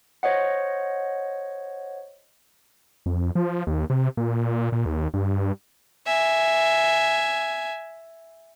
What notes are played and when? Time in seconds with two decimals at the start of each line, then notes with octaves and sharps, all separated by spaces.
0.23 C5 C#5 D#5 F#5
3.06 F2
3.35 F3
3.67 D#2
3.90 C3
4.17 A#2
4.72 A#2
4.86 D#2
5.14 G2
6.06 E5 G#5